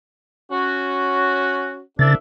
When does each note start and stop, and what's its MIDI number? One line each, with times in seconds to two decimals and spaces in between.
0.52 1.81 61
0.52 1.81 66
1.99 2.14 36
1.99 2.15 49
1.99 2.14 62
1.99 2.14 76
1.99 2.15 93